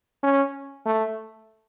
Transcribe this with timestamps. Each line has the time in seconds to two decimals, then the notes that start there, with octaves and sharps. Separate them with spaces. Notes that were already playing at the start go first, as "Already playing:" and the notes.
0.23 C#4
0.86 A3